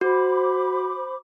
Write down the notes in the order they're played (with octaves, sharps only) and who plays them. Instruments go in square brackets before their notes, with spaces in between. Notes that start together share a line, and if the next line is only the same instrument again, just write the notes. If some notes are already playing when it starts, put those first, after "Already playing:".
[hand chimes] F#4 [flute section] C5 B5 D6